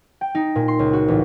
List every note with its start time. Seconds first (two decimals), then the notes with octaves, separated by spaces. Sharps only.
0.21 G5
0.35 D#4
0.55 A#2
0.68 C6
0.79 C#2
0.93 F#4
1.08 A1